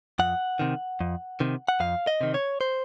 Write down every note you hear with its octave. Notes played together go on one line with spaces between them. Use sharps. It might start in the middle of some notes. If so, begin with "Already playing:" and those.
F2 F#5
C3 D#3
F2
C3 D#3
F#5
F2 F5
D#5
C3 D#3
C#5
C5